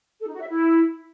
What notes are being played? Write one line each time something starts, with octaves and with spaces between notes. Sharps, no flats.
A4
D#4
F#4
E5
E4